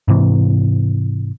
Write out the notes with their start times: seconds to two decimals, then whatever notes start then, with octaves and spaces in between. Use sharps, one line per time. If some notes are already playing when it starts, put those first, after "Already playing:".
0.08 G#2 C3 E3